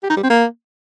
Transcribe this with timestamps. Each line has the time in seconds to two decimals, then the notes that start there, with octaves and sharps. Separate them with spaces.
0.03 G4
0.10 D#4
0.17 G3
0.23 C4
0.30 A#3